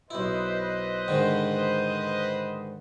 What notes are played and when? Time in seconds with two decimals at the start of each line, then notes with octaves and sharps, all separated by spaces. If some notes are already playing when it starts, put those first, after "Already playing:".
0.11 B1 E4 B4 C5 D#5
1.08 G#2 D3 D#3